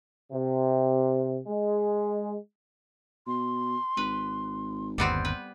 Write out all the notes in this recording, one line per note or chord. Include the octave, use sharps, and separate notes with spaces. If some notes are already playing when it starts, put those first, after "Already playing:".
C3
G#3
B2 C6
G#1 B4
G1 D#2 G3 B3 C4
B4